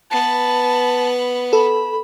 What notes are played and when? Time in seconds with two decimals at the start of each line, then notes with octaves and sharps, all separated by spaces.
0.11 B3 B4 A5
1.53 A4 B5